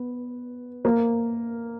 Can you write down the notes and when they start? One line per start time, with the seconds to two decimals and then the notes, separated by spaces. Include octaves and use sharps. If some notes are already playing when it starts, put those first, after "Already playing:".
Already playing: B3
0.85 A#3